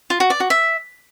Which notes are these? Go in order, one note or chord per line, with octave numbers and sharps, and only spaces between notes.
F4
F#4
D5
F#4
E5